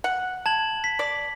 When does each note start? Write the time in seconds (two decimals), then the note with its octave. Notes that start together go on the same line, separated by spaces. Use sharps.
0.04 F#5
0.46 A5 G#6 F#7
0.84 B6
0.99 D5